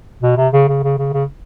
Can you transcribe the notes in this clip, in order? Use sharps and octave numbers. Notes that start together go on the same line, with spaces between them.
B2
C3
C#3
C#3
C#3
C#3
C#3